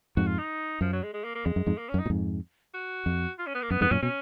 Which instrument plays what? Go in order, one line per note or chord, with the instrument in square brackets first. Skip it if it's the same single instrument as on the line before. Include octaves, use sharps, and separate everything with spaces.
[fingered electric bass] F2 G#2 [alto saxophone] F#4
[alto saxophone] F4
D#4
[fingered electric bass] F#2 [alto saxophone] F3
[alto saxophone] F#3
G#3
G#3
A#3
A#3
[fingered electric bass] F2 [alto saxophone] G#3
[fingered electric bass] F#2
F2 G#2
[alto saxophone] A#3
C#4
[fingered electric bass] F#2
[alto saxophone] D#4
[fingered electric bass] A#2
F2 G#2
[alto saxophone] F#4
[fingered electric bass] F2
[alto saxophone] F4
C#4
B3
A#3
[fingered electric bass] F#2 [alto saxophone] B3
[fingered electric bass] F2 G#2 [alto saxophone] B3
[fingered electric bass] F#2 A#2 [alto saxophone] C#4
[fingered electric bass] B2 [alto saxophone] C#4